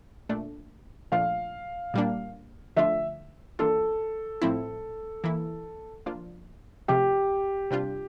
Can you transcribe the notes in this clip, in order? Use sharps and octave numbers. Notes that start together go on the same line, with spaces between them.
A#2 A3 D4
A#2 F3 A3 D4 F4 F5
A#2 G3 A#3 D4
D3 F3 A3 D4 F4 E5
E3 A#3 D4 F4 A4
A2 F3 C4 E4
E3 A#3 E4
F3 A#3 D4 F4
C3 F3 A3 G4
C3 G3 D4 F4